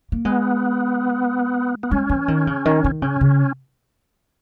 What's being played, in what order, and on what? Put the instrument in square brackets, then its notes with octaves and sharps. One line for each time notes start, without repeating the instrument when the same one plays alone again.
[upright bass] A#3
[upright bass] G#3 [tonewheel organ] B3
[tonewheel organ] B3
[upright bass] G#3 [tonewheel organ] C#4
[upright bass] E3
D#3
C#3
D#3
D#3
[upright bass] C#3 [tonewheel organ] C#4
[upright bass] C#3